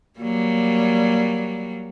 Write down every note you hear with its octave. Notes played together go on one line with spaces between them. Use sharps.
F#3 G3 A#3